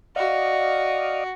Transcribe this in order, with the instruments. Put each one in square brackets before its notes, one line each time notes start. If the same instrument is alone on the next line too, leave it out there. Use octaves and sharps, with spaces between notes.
[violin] F#4 [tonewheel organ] D5 D#5 F5